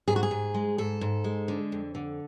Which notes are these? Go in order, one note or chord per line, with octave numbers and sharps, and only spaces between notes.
G#2 G#4
F#4
G#4
G#2
G#3
G#2 A4
G#2
G#3
D3
F2
D3